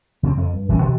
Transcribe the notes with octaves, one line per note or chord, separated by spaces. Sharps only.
C#3 F3 G3 C4
F2 D3
G2
A#1 E3 G3 C#4
G2 B2 D3 E3